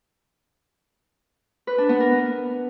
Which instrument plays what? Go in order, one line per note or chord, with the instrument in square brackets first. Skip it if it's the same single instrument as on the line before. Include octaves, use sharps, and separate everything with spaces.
[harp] B4
D4
B3
A#4
B3